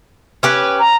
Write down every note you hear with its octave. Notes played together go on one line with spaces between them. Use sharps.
C#4 G4 B4
A#5